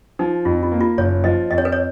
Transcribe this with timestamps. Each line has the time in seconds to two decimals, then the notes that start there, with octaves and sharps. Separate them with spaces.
0.19 F3 D#4
0.45 F2 F4
0.63 F4
0.72 A#3
0.81 F4
0.98 F#1 C#5
1.24 F3 D#5
1.51 F2 D#5
1.58 C#5
1.65 B4
1.72 C#5